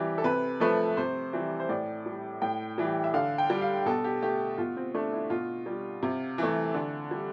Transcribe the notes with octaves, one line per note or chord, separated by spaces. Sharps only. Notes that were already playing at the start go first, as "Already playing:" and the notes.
Already playing: C3 E3 G3 G4
A4
C3 B4
F3 A3 B4
C3 C5
E3 G3
C5
A2 D5
G3
A2 G5
E3 G3
E5
D3 F5
G5
G3
F5
B2 A4
G4
A3 G4
B2 F4
C4
A3 D4
E4
B2 F4
G3
C3
E3 A3
D3
G3